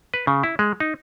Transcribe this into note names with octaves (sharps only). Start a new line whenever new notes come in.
B4
C#3
E4
G#3
D#4